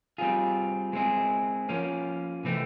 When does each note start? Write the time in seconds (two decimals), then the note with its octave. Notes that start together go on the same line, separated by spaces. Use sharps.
0.18 G3 C4 F4 G#4
0.93 G#3 C4 E4 G#4
1.69 F3 A#3 C#4
2.45 C3 E3 A3 C4